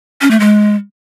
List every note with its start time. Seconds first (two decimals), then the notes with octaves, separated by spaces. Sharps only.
0.21 C#4
0.31 A3
0.40 G#3